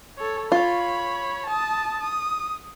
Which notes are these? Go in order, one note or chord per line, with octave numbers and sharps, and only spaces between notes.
A4 C#5
F4 C#5 B5
A5 D#6
D#6